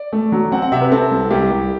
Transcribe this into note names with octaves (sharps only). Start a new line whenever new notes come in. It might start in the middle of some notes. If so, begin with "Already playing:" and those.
Already playing: D5
A3
F#3
C4 F#5
F#5
C3 E5
B4
C4 A4
C2
C2 G4
C2